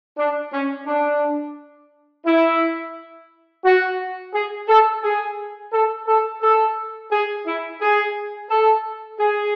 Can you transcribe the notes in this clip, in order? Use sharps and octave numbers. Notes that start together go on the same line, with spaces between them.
D4
C#4
D4
E4
F#4
G#4
A4
G#4
A4
A4
A4
G#4
E4
G#4
A4
G#4